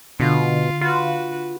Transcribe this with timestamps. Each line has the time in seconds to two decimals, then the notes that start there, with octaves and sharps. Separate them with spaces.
0.20 B2 D3 F4
0.81 F4 F#4 B4